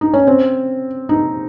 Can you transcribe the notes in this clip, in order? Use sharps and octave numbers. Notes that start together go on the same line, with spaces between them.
D#4
C#4
C4
D#4